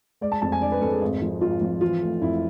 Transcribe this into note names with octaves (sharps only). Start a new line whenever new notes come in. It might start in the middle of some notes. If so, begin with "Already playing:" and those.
G#3 D5
A5
F2 A5
G#5
D3 D5
B4
F2 A4
G#4
G#1
F3
G#1 F4
F3
E3 F4
A3
F2 E4